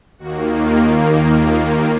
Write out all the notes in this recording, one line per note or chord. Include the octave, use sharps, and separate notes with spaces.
D#2 D#3 A#3 F#4
F4
F4